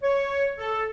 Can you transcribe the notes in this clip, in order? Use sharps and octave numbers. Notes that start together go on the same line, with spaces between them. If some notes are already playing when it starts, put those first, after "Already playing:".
C#5
A4